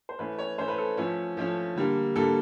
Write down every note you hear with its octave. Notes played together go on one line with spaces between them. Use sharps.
C5
E3 A3 C#4 B4
C#5
E3 A3 C#4 C5
B4
A4
F3 A3 C#4
F3 A3 C#4
D3 G3 A#3
D3 G3 A#3 A4